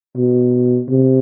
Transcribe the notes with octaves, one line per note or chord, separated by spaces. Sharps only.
B2
C3